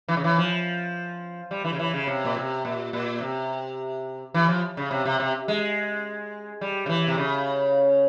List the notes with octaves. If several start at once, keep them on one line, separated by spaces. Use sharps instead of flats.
E3
C#3
E3
F3
G3
E3
C#3
E3
C#3
C3
A#2
C3
A#2
A#2
C3
E3
F3
C#3
C3
C3
C3
G#3
G3
C#3
E3
C3
C#3